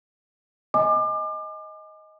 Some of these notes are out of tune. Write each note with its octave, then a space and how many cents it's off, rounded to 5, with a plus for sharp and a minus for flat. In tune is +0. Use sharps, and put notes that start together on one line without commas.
D#5 +10 G#5 +0 D6 +35